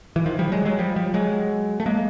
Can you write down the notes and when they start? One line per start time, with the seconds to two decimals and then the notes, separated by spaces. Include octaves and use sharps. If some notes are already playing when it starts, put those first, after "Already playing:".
0.16 E3
0.26 D#3 F3
0.39 F3 G3
0.52 F#3 G#3
0.65 F#3 G#3
0.79 F3 G3
0.96 F3 G3
1.14 F#3 G#3
1.80 A3
1.86 G#3 A#3